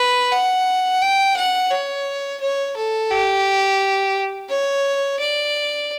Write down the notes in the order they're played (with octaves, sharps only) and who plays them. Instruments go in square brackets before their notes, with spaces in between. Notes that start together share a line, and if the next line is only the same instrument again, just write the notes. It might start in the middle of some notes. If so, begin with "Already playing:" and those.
Already playing: [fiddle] B4
F#5
G5
F#5
C#5
C#5
A4
G4
C#5
D5